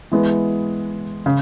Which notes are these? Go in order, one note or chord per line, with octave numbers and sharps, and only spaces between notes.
E3 G#3 B3
C#3